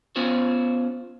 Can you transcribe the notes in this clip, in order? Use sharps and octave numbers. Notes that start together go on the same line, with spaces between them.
B3 C#4 F4 C5 C#5